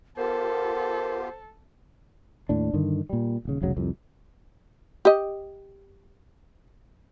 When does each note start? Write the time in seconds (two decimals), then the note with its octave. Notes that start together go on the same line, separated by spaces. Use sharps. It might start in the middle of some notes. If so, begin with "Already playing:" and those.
0.17 B3 F4 G4 A4 A#4 C5
2.49 D#2 A2 D4
2.73 G2 D3 D#3
3.10 A#2 G3
3.45 D#1 C#3
3.62 F1 C2 C#3 F#3
3.77 C2 F2
5.05 G4 D#5